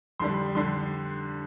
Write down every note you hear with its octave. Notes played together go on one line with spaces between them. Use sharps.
F2 D3 G3 C6
F2 D3 G3 C6